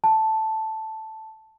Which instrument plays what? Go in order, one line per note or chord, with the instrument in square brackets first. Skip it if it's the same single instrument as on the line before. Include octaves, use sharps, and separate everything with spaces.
[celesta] A5